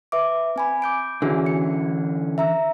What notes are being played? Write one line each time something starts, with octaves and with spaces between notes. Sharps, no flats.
B4 E5 D6
C4 G#5 B5
D6 G6 D7
D3 E3 C#4 D4 F#4 G#4
C#7
E5 A#5 E6